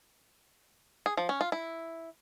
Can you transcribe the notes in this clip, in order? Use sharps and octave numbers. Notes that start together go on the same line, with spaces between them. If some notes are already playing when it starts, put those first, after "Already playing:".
G#4
F3
C#4
F4
E4